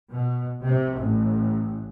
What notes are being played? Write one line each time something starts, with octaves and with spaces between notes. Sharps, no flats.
B2
C3
A1